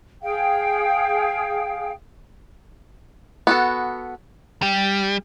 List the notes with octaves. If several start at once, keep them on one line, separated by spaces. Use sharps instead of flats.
G#4 F5 G5
B3 F#4 A4
G3